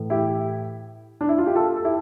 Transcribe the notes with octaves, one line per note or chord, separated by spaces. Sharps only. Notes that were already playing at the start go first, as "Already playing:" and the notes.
Already playing: A2 E3
E4 G4
D4
E4
F4
G4
F4 A4
A4
E4 G4